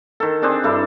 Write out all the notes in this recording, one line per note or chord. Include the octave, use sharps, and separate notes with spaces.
D#3 A4
C4 D4 G#4
G2 E4 A4